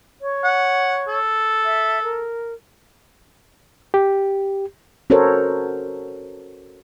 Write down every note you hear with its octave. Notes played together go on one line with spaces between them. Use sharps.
C#5
F#5
A4
E5
A#4
G4
C#4 F#4 A4 A#4 C5 C#5